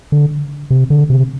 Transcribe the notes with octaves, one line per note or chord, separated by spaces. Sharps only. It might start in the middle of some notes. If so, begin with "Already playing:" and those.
D3
C3
D3
C3